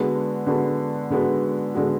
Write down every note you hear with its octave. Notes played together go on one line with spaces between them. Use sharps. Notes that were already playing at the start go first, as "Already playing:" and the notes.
Already playing: D3 G#3 B3 F#4
D3 G#3 B3 F#4
D3 G#3 B3 F#4
D3 G#3 B3 F#4